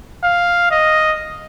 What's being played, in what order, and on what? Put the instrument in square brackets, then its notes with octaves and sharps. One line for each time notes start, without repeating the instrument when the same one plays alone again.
[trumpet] F5
D#5